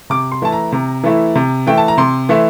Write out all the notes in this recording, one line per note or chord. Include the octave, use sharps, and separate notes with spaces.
C3 D6
C6
E3 A3 E4 A5
A#5
C3
E3 A3 E4
C3
E3 A3 E4 G5
A5
A#5
C3 C6
E3 A3 E4